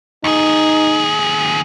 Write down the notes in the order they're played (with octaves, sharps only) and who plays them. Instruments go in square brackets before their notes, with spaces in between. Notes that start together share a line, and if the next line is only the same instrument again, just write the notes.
[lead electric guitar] D#2 G#4 [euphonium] D#4